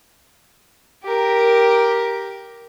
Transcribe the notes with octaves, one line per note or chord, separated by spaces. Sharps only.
G4 A#4